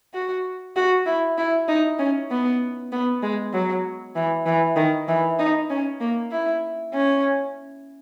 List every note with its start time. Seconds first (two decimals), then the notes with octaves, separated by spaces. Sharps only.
0.14 F#4
0.76 F#4
1.06 E4
1.38 E4
1.68 D#4
1.99 C#4
2.30 B3
2.92 B3
3.22 G#3
3.53 F#3
4.15 E3
4.46 E3
4.76 D#3
5.08 E3
5.39 D#4
5.70 C#4
6.00 A#3
6.31 E4
6.94 C#4